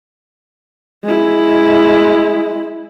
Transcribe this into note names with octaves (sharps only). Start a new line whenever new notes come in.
G#3 E4